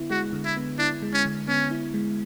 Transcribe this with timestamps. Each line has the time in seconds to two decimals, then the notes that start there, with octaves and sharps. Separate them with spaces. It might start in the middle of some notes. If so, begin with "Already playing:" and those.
Already playing: D3 B3 E4
0.10 G#3 F#4
0.33 D3
0.45 E4
0.56 B3
0.78 D4 E4
1.02 G#3
1.13 C#4
1.25 D3
1.47 B3 C#4
1.71 E4
1.94 G#3